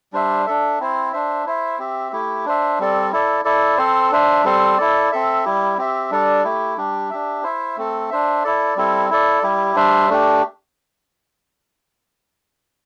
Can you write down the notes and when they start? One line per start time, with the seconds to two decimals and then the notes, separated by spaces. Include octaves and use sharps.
0.13 G3 D4 C5 E5
0.46 D4 A4 E5
0.79 C4 E4 C5
1.12 D4 C5 E5
1.46 E4 C5 E5
1.79 C4 G4 E5
2.12 A3 E4 G4
2.46 D4 C5 E5
2.79 G3 C4 A4 D5
3.12 E4 A4 D5
3.45 E4 A4 D5
3.78 C4 A4 C5
4.11 D4 C5 E5
4.44 G3 C4 A4 C5
4.78 E4 A4 D5
5.12 C4 A4 E5
5.45 G3 E4 G4
5.78 C4 G4 E5
6.11 G3 D4 A4 D5
6.44 A3 E4 G4
6.77 G3 D4 G4
7.10 D4 G4 E5
7.43 E4 C5 E5
7.77 A3 C4 A4
8.10 D4 C5 E5
8.44 E4 A4 D5
8.76 G3 C4 E4 A4
9.10 E4 A4 D5
9.43 G3 E4 G4
9.76 G3 D4 C5 E5
10.09 A3 D4 G4